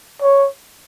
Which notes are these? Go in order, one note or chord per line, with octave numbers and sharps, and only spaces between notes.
C#5